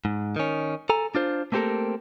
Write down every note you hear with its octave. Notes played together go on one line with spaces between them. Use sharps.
G#2
D#3 C#4
A4 G#5 A#5
D4 F4 C5
A3 A#3 C4 G4 A4 A#4